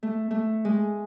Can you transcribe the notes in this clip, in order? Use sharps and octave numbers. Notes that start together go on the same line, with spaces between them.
A3
A3
G#3